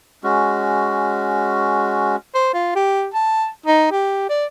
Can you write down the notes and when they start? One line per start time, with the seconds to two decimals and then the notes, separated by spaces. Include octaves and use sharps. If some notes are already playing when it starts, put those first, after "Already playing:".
0.24 G#3 C#4 F#4
2.35 C5
2.53 F4
2.75 G4
3.14 A5
3.66 D#4
3.91 G4
4.29 D5